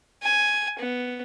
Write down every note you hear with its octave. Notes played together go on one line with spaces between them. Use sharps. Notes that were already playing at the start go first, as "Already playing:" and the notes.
G#5
B3